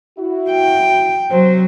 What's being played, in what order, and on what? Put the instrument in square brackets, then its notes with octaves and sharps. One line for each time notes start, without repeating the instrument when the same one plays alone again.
[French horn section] E4 F#4
[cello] G5
[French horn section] C3 C5 [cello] F#3